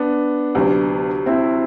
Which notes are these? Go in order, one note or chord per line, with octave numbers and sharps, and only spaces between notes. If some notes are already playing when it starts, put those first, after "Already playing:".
Already playing: B3 D4
D2 C3 F#3
C4 E4